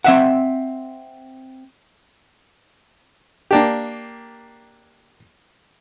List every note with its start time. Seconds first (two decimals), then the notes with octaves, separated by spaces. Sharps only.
0.04 C4 E5 F#5
3.51 A#3 D4 G4